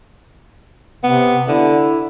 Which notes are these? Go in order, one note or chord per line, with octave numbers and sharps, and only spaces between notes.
C3 B3
D3 E4